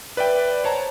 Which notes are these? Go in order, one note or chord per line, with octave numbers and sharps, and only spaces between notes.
B4 D5 E5 G5
C5 C#5 A5 A#5